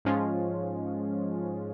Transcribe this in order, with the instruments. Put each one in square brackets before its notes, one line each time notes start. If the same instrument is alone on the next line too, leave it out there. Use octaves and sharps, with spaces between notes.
[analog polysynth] G#2 F3 G#3 C#4 F4